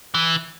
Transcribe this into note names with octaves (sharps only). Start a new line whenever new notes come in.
E3